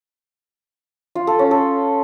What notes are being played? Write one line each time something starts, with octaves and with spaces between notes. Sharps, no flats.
F4
A4
C#4
A4